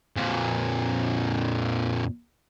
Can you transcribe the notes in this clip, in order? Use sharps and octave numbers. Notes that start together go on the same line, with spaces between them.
F2 A#2